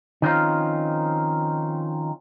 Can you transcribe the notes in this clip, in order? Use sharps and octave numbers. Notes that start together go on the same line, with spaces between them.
D#3 F3 C4 C#4 D#4 F4